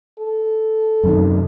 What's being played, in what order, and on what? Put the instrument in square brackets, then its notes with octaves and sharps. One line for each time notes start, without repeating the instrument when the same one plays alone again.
[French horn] A4
[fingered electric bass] F#2 C3 D#3